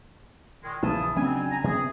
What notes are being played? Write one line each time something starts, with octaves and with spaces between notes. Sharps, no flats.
A#2 D#3 G#3
A#1 C#3 E3 A5 D#6
F2 C#3 F#3 C4 D4 G#5
G#5 A#5
C3 B3 G#4